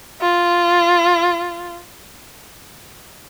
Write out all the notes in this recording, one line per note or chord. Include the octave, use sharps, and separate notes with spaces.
F4